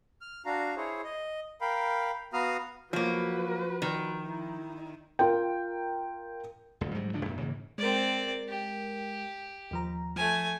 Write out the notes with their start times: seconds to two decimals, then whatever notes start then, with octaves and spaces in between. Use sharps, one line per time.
0.21 F6
0.46 D4 F#4 F5 A#5
0.77 E4 G#4 C5 C#5
1.04 D#5
1.61 A#4 F5 G5 B5
2.33 B3 F#4 F5 A#5 D#6 F6
2.93 F3 F#3 A#3 F#4 B4
3.82 D#3
4.27 E4
5.19 F4 A#4 G5
6.81 D#1 D2
6.95 G#2 F#3 G3
7.13 G1 C#3 F3 D4
7.25 F#2 A#2
7.39 G#2 C#3 E3 A#3
7.78 G#3 C4 A#4 D5
8.48 G4
9.71 D#2 F3 A#5
10.16 F3 A3 G#5